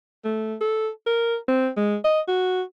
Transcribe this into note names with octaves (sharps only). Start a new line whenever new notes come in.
A3
A4
A#4
C4
G#3
D#5
F#4